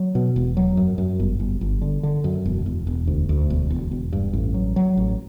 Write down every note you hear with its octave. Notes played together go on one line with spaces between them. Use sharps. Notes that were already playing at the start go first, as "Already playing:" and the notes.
Already playing: F#3
B2
E1
F#3
F#2
F#2
G1
G1
G1
D3
D3
F#2
E1
E1
E1
D2
D2
E1
E1
E1
G2
A1
F#3
F#3
A1